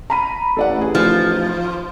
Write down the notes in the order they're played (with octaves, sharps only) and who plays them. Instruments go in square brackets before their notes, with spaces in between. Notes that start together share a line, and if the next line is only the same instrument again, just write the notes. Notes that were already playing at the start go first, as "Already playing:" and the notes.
[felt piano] A#5 B5 D#7
[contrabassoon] A1 [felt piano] A4 D5 F#5
[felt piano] A2 G#4
[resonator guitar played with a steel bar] F3 [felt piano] D#4